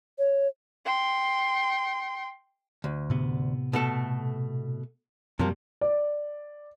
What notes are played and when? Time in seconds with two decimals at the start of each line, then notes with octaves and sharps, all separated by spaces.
0.19 C#5
0.85 G5 C6
2.84 D2
3.10 A2 C3 B3
3.73 B2 A3 A4
5.39 F#2 C3 F3 G3 A#3
5.81 D5